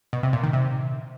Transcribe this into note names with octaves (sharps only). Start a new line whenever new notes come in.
B2
C3
A#2
D#3
C3